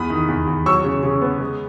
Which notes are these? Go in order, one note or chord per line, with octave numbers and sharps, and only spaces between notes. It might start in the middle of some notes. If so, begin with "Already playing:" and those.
Already playing: E2 B5 D#6
D#3
E2
E2
F#3 C#6 E6
C#3
C#3
B3
G#3